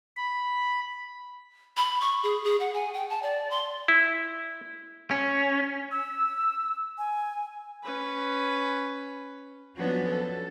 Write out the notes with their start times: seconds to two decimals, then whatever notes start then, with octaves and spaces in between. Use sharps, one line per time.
0.16 B5
1.77 B5
2.01 C#6
2.23 G#4
2.44 G#4
2.60 F#5
2.74 G#5
2.94 G5
3.10 A5
3.22 D5
3.51 C6
3.88 E4
5.11 C#4
5.92 E6
6.98 G#5
7.83 C#4 B4
9.76 F3 F#3 B3 C#4 D4 F#4
10.08 A4